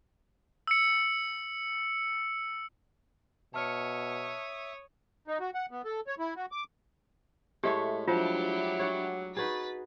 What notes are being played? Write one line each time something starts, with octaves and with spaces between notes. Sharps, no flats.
E6 C#7
B2 C#5 E5 A5 D#6 F6 C#7
D#4
F#4
F#5
B3
A4
C#5
E4
F#4
D6
A2 G#3 A3 G4 C#5
F3 F#3 D4 E4 F4 G4
C#5 D5 F#5
D#4 F#4 G#4 B4 A6 B6